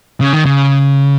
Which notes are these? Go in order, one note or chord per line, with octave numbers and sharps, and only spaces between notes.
C#3
D#3
C#3